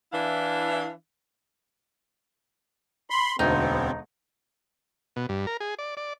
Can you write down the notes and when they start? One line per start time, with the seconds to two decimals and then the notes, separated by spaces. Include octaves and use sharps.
0.13 E3 D4 E4 F5
3.10 B5 C6
3.39 E1 D2 B3 C4 D#4
5.16 B2
5.29 G2
5.47 A#4
5.60 G#4
5.79 D5
5.97 D5